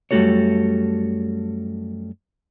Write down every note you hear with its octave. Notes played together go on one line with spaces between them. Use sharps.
F#2 G3 A3 F#4 A4 C#5